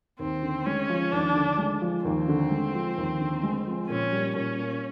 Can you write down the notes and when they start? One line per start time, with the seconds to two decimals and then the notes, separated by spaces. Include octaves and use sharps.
0.19 D#2 C4
0.43 D3
0.66 G#3 C#4
0.89 F3
1.12 D#2 D4
1.35 D3
1.58 G#3
1.81 F3
2.04 D#2 C4
2.28 D3
2.51 G#3
2.74 F3
2.97 D#2
3.20 D3
3.43 G#3
3.67 F3
3.89 A#2 C#4
4.12 G3
4.35 A#2 C#4
4.59 A#3